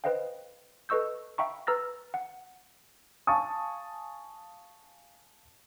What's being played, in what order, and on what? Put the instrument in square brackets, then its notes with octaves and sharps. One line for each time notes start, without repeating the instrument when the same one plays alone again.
[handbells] B4 C5 D#5 F5 G5
A4 B4 D#5 C#6 E6 G6
E5 F5 G5 A#5 B5 C#6
B4 A#5 E6 F6 A6 A#6
F#5
[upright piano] F5 G#5 A5 C#6 D#6